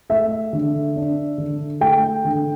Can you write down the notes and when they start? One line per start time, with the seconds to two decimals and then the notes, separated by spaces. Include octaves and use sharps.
0.09 A3 E5
0.53 D3
0.96 D4
1.38 D3
1.81 A3 G5
2.25 D3